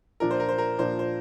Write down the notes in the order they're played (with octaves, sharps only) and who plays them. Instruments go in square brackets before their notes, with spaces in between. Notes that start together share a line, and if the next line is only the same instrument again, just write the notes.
[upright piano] A#2 F3 D4 [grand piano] A#4
[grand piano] C5
A#4
C5
A#4
[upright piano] A#2 F3 D4 [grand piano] C5
[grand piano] C5